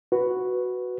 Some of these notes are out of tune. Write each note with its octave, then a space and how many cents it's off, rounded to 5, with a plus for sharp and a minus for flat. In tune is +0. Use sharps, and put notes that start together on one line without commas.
F#4 +0 B4 +0